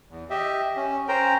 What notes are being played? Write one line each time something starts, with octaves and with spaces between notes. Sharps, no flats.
E2
G4 D#5 E5
C#4
C#4 A#4 C5 G5 A#5